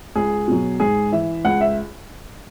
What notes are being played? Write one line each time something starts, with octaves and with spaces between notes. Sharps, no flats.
C#2 G#4
B2 F#3
G#2 G#4
E3 E5
C#2 F#5
E5